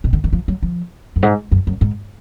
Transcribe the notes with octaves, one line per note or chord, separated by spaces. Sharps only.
B2
D3
D#3
F3
F#3
F3
F#2
G#2
F#2
F#2
G#2